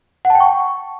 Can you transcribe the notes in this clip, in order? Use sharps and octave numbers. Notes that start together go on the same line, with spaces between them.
F#5
A5
G5
C#6